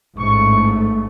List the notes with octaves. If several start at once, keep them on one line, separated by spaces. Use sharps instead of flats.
A1 G#2 A3 C#6